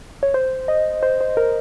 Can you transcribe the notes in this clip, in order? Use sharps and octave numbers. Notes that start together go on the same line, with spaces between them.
C#5
C5
D#5
C5
C5
A#4